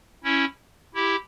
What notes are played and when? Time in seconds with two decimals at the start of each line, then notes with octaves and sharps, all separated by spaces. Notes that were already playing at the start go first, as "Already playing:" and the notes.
0.24 C#4 E4
0.95 E4 G4